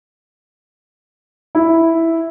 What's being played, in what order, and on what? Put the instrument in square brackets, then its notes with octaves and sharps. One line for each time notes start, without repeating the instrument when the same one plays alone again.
[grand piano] E4